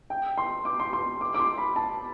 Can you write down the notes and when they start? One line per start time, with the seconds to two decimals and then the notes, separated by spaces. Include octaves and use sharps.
0.10 G5
0.38 C6
0.65 D6
0.80 C6
0.93 C6
1.21 D6
1.34 D6
1.40 C6
1.58 B5
1.76 A5